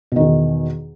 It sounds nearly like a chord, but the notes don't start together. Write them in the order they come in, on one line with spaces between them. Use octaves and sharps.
B2 D#3 E2